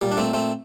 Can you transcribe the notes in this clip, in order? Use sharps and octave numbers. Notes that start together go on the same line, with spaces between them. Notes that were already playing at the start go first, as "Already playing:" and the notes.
A#2 G3
D4
A3 C4
A3 C4